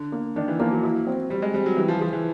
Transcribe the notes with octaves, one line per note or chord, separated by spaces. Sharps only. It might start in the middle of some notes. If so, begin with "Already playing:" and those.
Already playing: D3
A#3
D#3 D4
E3
F3 A#3
F#3
E4
C4
G3 C4
G#3
G3 C4
F#3
E3 G3
F3
F3 G#4
E3